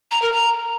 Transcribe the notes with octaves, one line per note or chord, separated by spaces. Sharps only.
A#5
A#4
A#5